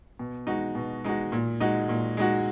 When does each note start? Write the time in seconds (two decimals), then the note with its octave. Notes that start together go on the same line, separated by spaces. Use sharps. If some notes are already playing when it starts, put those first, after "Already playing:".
0.19 B2
0.47 G#3 D#4 F#4
0.75 B2
1.04 G#3 D#4 F#4
1.32 A#2
1.60 G#3 D#4 F#4
1.89 A#2
2.17 G#3 D#4 F#4